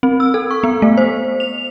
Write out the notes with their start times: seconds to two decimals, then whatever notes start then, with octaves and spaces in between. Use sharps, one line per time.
0.03 C4
0.20 E6
0.34 A4
0.51 C#6
0.63 B3
0.82 A3
0.97 C5
1.40 F7